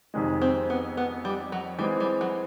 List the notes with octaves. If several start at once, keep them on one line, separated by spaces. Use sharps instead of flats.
F2 C3 D#3 G#3
C4
B3
B3
G3
F#3
E3 G3 G#3 C4
G3
F#3